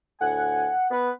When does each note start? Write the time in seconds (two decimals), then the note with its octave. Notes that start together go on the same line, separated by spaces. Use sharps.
0.21 D2 A2 F#5 G#5
0.91 B3 B4